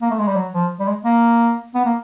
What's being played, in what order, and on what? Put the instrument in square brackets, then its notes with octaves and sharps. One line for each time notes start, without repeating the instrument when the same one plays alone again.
[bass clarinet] A#3
A3
G#3
G3
F#3
F3
G3
G#3
A#3
B3
A#3